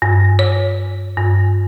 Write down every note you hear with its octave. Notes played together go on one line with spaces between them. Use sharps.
G2
C#5
G2